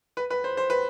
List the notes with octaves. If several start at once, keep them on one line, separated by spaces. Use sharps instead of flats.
B4
B4
C5
C5
B4